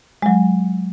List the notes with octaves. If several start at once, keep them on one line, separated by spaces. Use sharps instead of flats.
F#3 G#3